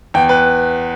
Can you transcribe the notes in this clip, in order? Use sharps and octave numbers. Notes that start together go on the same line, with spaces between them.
E2 G5
B4